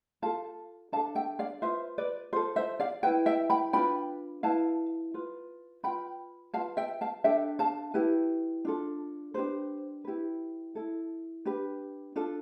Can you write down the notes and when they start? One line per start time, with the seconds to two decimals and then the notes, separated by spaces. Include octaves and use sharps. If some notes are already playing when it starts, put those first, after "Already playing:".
0.22 F4 A4 F5 A5
0.92 D4 F5 A5
0.96 A4
1.15 E5 G5
1.39 D5 F5
1.62 F4 B4 C5 E5
1.98 B4 D5
2.33 F4 A4 C5
2.56 C5 E5
2.80 D5 F5
3.03 B4 E5 G5
3.07 E4
3.26 E5 G5
3.50 G5 B5
3.73 D4 F4 B4 G5 B5
4.43 E4 B4 F5 A5
5.14 F4 B4
5.83 F4 B4 G5 B5
6.54 F4 B4 F5 A5
6.77 E5 G5
7.01 F5 A5
7.24 D4 A4 E5 G5
7.59 F5 A5
7.94 E4 G4 B4
8.65 D4 F4 A4
9.34 D4 G4 B4 C5
10.05 E4 G4 B4
10.75 E4 A4
11.45 D4 G4 B4
12.16 D4 F4 A4